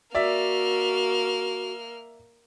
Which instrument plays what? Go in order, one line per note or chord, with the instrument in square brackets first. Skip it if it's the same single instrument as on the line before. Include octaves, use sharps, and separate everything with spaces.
[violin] A#3 F6 [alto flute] F#4 [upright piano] D5 E5